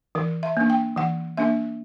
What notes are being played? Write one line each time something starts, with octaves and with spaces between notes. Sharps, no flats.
E3 A#4
E5
A#3 D4
G5
E3 F#5
A#3 D4 E5